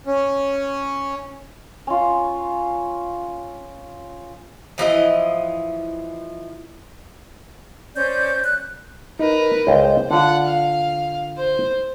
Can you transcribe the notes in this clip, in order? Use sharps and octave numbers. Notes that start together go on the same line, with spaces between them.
C#4
C#4 F4
E3 F3 E4 D#5
C#4 C5 D5 G6
F#6
D#4 A#4 B4
C#2 C5 D#5 G5
D3 F4 D5 F#5
F5
C5